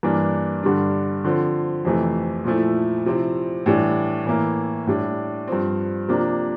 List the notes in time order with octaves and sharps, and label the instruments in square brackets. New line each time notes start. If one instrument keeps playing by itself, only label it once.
[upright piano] G2 E3 A#3 D4
G2 D3 G3 D4
D3 F3 C4
F2 C3 E3 A3
A#2 F3 A3 E4
C3 F3 C4 E4
A2 E3 G3 D4
A2 E3 A#3 E4
A2 G3 D4
G2 F3 C4
C3 F3 A#3 D4